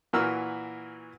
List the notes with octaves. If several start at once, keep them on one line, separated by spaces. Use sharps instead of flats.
A#2 E3 F#4 A#4 E6 F6